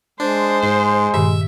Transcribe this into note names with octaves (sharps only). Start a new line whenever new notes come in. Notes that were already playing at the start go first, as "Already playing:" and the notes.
G#3 D4 C5
G#2
G2 A#2 D#3 E5